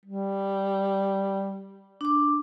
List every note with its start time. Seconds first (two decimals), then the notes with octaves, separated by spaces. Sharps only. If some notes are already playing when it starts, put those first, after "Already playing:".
0.05 G3
2.01 D4 D6